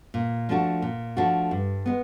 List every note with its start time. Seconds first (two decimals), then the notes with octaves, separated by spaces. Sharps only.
0.14 A#2
0.49 F3 A3 D4 F#4
0.82 A#2
1.17 F3 A3 D4 F#4
1.51 G2
1.86 G#3 B3